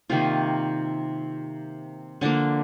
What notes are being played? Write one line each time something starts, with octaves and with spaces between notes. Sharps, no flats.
C3 D#3 A#3 F4
D3 F3 A#3 D4